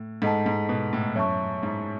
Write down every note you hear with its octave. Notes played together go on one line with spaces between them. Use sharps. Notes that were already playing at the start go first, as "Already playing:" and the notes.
Already playing: A2
G#2 A4 D#5 F#5 A5
G#2
B2
A2
F#2 C#5 E5 A5 C#6
G#2